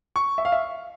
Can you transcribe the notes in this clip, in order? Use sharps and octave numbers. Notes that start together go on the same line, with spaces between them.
C#6
E5
F5
E5